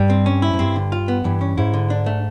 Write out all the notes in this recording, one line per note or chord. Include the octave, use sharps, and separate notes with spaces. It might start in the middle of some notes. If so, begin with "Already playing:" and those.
Already playing: G2 G3
C4
C#4
E4
G#2
G2 C4
D3
F4
B3
G2 E3
C#4
G#2 E4
D3
D4
A3